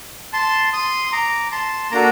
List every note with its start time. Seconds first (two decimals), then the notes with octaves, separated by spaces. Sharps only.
0.33 A5 C6
0.73 C6 D#6
1.07 C6
1.12 A#5 D6
1.52 A5 C6
1.91 A#3 D4 F#4 A4 A#5 D6